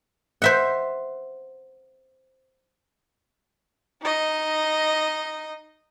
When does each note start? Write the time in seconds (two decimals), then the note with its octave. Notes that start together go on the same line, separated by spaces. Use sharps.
0.42 C5 E5 F#5
4.02 D#4 D#5